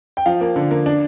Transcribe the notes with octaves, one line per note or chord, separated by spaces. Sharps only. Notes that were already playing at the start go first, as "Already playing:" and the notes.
G5
F3 F5
A#3
D3
A#3
D4